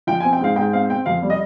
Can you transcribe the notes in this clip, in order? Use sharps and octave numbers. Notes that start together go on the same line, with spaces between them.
F3 G5
G#5
C4
G5
G#2 F5
G#2 G5
C4 F5
C4 G5
F2 F5
G3
D#5